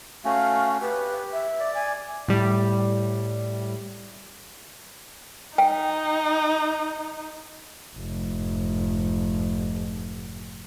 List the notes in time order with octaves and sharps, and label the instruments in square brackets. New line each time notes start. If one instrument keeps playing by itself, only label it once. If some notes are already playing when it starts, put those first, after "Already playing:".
[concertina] A3 C#4 F#4 [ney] F5
[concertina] G4 [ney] B4
[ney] E5
[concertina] D5
[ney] G#5
[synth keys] A2 G3
[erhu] D#4 [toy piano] G5
[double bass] F1 G#2